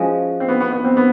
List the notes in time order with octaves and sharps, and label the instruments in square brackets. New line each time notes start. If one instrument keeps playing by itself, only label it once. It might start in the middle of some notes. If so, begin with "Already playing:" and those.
Already playing: [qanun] F3 G#3 C#4 F#4
[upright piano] C4
B3
B3
B3
C4
B3